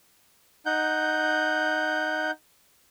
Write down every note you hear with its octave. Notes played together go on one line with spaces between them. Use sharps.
D#4 F#5 G6